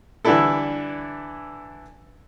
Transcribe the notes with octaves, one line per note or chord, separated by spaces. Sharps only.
D3 E3 G3 D4 E4 A4